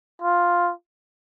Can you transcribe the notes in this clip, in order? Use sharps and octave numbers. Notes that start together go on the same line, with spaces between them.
F4